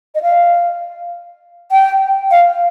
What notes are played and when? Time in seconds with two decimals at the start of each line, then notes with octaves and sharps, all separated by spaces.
0.15 D#5
0.22 F5
1.72 G5
2.31 F5